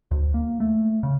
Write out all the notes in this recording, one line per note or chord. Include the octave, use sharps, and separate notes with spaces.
D2
A#3
A3
C#3